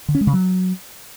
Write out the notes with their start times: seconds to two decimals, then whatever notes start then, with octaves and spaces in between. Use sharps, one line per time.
0.08 D3
0.15 C#4
0.21 G#3
0.27 C#3
0.33 F#3